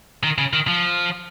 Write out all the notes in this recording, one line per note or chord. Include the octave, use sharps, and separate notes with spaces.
D#3
C#3
D#3
F3